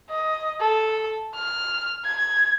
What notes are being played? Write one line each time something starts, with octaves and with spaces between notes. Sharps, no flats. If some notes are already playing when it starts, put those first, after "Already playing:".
D#5
A4
F6
G#6